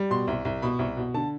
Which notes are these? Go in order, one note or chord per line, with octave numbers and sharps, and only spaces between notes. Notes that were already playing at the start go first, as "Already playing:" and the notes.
Already playing: G3
B2 C6
C2
C2
B2 B5
C2
B2
D3 A5